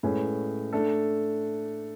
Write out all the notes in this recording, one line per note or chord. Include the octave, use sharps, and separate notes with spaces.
A2 G#3 C#4 G#4 B4
A3 D4 A4